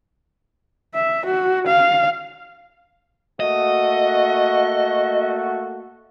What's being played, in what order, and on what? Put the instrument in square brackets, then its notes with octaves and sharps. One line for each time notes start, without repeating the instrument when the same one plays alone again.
[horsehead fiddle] E5
F#4
F5
[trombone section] A3 A#3 F#4 [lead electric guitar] D#5